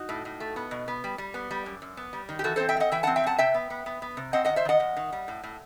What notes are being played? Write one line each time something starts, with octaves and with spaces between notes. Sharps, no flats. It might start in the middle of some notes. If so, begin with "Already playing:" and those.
Already playing: D#4 F#4
A2
A2
A3
B3
B2
B3
G3
G3
B3
G3
F#2
F#2
B3
G3
D#3
G4
E3 F#4 A4
C4 A4 C5
E5 G5
A3
D#5 F#5
E3 E5 G5
F#5 A5
C4
E5 G5
F#2 F#5 A5
C3 E5 G5
B3
B3
B3
B3
C3
C4 D#5 F#5
D#3 D#5 F#5
C5 E5
D#3 D#5 F#5
E2
D#3
G3
A2
A2